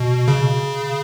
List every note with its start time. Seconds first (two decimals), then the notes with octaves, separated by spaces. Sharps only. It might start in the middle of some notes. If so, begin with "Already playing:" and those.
Already playing: B2
0.28 C#3